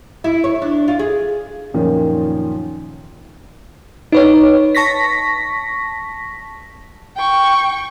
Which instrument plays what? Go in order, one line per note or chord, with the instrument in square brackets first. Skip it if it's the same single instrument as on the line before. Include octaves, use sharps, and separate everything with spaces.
[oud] E4
C#5
D4
F4
G#4
[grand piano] F#2 A#2 D#3 F3 C#4
[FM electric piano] D#4 B4 C#5
A5 C#6 A#6 B6
[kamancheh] G5 C#6